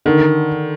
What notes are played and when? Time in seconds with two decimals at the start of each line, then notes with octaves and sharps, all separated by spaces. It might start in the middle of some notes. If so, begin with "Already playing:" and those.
0.06 D3 D#3